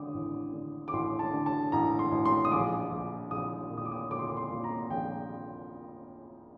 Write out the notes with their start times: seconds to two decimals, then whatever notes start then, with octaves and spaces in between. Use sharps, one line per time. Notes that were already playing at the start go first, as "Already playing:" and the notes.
Already playing: D3 D6 D#6
0.14 A1
0.54 D3
0.88 D6
0.93 A1 C6
1.19 A5
1.33 D3
1.46 A5
1.72 A1 A#5
1.99 C6
2.12 A1
2.25 C6
2.45 D#6
2.52 A#1 D6
2.91 A#1
3.31 A#1 D#6
3.70 A#2
3.77 D#6
3.85 D6
3.92 D#6
4.11 A#2 D6
4.19 C6
4.27 D6
4.37 C6
4.50 A#2
4.64 A#5
4.90 A#1 G5